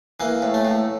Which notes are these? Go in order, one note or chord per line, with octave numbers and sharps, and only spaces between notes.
E3 A#3
A2
A3
A2